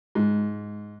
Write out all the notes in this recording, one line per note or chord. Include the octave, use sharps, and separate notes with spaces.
G#2